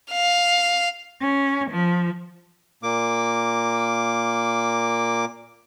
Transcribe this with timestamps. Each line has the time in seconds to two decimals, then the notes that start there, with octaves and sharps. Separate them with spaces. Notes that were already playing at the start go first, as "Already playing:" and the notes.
0.12 F5
1.20 C#4
1.70 F3
2.83 A#2 A#3 D6